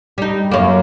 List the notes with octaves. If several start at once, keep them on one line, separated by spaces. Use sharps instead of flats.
G3 D#4
F#2 A#3